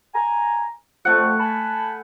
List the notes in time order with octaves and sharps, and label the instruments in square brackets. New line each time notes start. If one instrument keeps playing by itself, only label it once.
[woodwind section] G#5 A#5
[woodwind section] F2 [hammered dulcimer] A3 F#5
[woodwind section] G#5 A5 B5